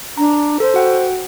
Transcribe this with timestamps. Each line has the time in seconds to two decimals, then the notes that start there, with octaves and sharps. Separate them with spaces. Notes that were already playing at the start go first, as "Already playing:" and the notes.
0.18 D4 A#5
0.60 A4 C5
0.74 F#4 F#5 G5